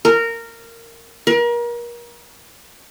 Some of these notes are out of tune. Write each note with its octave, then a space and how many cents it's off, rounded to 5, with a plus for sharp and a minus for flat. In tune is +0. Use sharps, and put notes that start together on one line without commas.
A#4 -15
A#4 +35